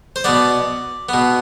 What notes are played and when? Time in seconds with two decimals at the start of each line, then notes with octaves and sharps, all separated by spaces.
0.16 C5
0.24 B2 B3 D5
1.09 B2 B3